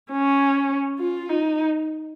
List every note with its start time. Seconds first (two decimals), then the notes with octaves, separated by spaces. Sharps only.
0.12 C#4
0.99 F4
1.29 D#4